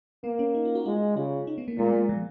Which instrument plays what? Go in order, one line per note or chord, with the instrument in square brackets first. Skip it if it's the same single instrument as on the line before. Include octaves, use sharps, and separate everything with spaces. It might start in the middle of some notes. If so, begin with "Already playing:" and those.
[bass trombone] A#3 [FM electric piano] B3
[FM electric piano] C#4
D#4
F4
F#4
[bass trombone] G#3 [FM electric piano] F4
[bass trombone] C#3 [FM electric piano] F4
[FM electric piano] D#4
B3
A#3
[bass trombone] A#2 [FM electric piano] G#3
[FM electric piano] A#3
G#3
F3